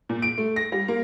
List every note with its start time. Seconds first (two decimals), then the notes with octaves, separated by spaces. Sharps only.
0.09 A#2
0.22 D7
0.38 A3
0.56 A#6
0.72 G3
0.88 A#3